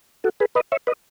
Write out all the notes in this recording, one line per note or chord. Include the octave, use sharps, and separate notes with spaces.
F#4 A4
G#4 B4
B4 D#5
C#5 E5
B4 D#5